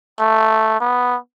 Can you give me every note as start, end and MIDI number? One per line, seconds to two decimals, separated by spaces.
0.19 0.79 57
0.81 1.17 59